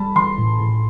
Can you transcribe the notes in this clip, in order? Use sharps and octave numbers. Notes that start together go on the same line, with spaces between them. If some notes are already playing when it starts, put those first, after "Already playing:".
Already playing: G3 A5 B5
E3 C6
A2
A2